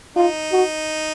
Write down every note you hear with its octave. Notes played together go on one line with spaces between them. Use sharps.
D#4 F4
F#4